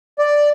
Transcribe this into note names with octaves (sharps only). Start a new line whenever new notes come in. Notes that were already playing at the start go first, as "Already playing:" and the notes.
D5